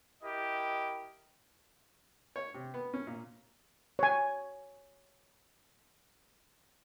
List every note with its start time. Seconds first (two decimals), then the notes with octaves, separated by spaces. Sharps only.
0.23 E4 G4 A#4 D#5
2.36 C#5
2.54 C3
2.74 B3
2.94 C#4
3.07 A#2
3.99 C#5 G#5